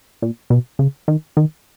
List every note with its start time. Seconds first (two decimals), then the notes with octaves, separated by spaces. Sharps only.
0.22 A#2
0.50 B2
0.79 C#3
1.08 D#3
1.37 D#3